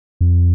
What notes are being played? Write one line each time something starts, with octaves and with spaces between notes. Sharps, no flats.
F2